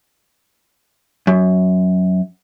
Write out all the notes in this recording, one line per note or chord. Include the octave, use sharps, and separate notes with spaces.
F#2